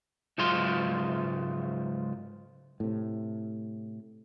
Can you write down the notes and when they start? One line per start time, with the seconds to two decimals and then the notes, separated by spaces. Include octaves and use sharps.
0.38 C#2 G#2 F#3 G#3 F4 C6
2.80 A2 C3